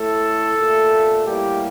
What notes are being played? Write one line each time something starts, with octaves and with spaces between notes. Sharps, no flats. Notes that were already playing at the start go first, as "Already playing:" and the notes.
Already playing: A2 A3 A4
A#2 A3
A2 G3 A#3 G4